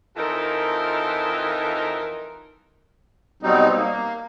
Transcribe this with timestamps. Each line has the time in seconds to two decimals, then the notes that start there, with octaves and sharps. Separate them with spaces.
0.16 F2 E3 D#4 F4 A4 A#4
3.43 B2 F#3 G3 C4 D#4
3.75 A#3